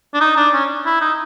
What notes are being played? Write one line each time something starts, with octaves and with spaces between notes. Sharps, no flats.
D4
D#4
D4
C#4
E4
D#4